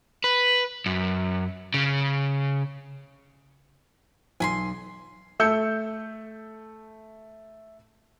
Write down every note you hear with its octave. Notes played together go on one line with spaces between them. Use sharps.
B4
F#2
C#3
B1 G#5 B5 C6
A3 E6 G6 C#7